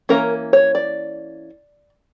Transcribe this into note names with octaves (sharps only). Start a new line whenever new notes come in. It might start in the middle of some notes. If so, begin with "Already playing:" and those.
E3 A#3 C#4 A#4
C#5
D5